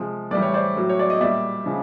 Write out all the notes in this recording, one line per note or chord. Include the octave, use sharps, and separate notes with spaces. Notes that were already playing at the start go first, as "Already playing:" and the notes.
Already playing: C3 F3 G#3
A2 E3 G3 D5
C#5
C5 D5
A2 F#3
C#5
D5
D#5
A#2 G3 D5 E5
C#3 F3 G#3